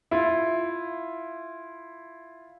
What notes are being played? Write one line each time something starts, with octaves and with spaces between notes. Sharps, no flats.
E4 F4